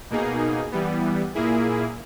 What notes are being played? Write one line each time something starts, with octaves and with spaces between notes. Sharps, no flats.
B2 A#3 D#4 G#4
E3 G3 B3
A#2 A#3 E4 G#4